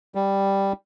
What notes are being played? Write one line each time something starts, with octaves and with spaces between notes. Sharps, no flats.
G3